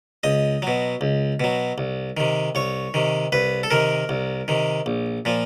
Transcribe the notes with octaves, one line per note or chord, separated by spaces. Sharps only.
C#2 D#5
B2 F#3
C#2
B2 F#3
C2
C3 D#3
C2 C#5
C3 D#3
C2 B4
A4
C3 D#3 A#4
C2
C3 D#3
A#1
A#2 F3